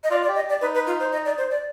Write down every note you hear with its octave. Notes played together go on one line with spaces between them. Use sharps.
D#5
F4 D5
D5
G4
D#5
G4
D5
D#4 B4
B4
F4
C5
D#5
D5
C5
D5